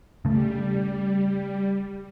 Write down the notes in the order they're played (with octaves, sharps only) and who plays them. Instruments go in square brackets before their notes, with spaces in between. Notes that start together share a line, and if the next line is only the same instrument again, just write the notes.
[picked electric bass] C#3 A3 [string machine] G3